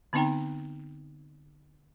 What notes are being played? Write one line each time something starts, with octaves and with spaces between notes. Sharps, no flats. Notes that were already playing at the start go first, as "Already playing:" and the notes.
D3 B3 C4 D#4 G5 A#5